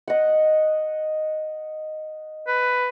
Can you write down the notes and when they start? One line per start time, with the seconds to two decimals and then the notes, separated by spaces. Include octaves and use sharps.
0.08 D#5 F#5
2.47 B4